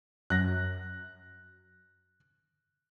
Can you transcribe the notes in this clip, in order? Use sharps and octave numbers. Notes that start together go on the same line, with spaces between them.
F#2 F#6 A#6